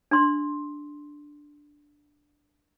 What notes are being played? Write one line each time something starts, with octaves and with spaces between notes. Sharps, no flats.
D4 C6